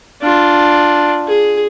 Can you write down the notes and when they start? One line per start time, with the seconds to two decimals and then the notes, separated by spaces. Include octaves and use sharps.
0.22 D4 F4
1.28 G#4